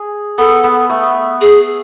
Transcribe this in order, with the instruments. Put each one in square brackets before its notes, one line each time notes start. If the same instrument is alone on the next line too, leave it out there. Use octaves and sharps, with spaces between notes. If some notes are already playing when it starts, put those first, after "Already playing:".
Already playing: [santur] G#4
[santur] B3 [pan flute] A4
[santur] B3
A3
[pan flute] G#4